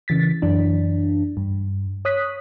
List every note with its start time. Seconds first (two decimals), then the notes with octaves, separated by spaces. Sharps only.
0.08 C#3 E3 A6 B6
0.42 F#2 E3 D4
1.37 G2
2.05 C#5 D#6 F#6 B6